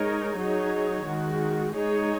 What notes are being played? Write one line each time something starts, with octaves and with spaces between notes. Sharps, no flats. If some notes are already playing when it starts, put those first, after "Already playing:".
Already playing: G#3 D#4 A#4 C#5
F#3 D#4 G#4 C#5
D#3 G#3 F#4
G#3 D#4 G#4 C#5